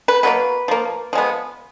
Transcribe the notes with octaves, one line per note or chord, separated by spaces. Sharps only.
B4
B2 F#3 A#3 B4
F3 A#3
F3 G#3 B3